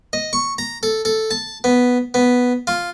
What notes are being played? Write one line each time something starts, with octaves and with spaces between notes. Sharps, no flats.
D#5
C#6
A#5
A4
A4
A5
B3
B3
F4